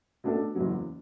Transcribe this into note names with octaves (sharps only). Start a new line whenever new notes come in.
B2 A3 D4 A4
F#1 E2 B2 F#3